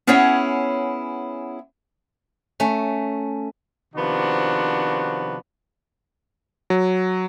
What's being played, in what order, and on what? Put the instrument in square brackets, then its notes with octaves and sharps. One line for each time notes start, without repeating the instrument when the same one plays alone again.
[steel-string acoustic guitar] B3 C#4 E4 G#4 C#5 F#5
[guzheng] A3 C#4
[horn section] C3 D#3 F3 B3 D4 F#4
[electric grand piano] F#3